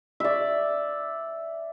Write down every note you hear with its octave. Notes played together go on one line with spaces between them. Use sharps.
D5 E5